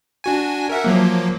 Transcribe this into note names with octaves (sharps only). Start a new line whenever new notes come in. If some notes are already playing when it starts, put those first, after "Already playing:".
D4 F#4 G#5
A#4 E5 F#5
F3 F#3 A#3